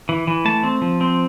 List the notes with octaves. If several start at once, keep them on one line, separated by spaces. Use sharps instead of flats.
E3
E3
A3 A5
C4
F3
C4